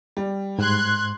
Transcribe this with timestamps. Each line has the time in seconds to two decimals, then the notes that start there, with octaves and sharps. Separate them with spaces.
0.17 G3
0.59 G#2 C6 F#6 G#6